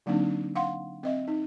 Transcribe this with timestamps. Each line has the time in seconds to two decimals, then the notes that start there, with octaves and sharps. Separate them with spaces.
0.06 D3 F#3 A#3 C4 D4 D#4
0.56 F5 F#5 C6
1.03 C4 D#5 E5
1.28 D#4